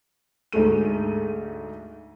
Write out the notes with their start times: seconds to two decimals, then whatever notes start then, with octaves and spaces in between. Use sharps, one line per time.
0.52 D2 G#2 G#3 A3 D#7